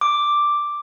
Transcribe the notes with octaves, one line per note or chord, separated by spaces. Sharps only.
D6